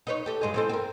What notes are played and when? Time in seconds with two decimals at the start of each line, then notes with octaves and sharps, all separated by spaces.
0.07 D#4 B4 C#5
0.26 G4 A4
0.42 G2 G#3 D#5
0.54 E3 C4 A4
0.69 C4 A#4